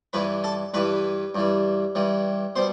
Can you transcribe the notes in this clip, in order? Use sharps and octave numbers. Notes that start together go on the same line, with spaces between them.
G2 E3 G3 B4 B5
A4 A5
G2 E3 G3 B4 B5
G2 E3 G3
G2 E3 G3
B2 G3 C5 C6